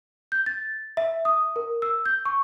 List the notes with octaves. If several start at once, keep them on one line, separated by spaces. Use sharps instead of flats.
G6
A6
E5
D#6
A#4
E6
G6
C#6